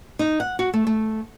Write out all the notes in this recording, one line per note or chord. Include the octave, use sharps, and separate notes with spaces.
D#4
F#5
F#4
A3
A3